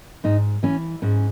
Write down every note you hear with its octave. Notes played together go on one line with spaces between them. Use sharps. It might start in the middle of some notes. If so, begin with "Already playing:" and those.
G#2 D#4
E3 C#4
G#2 C#4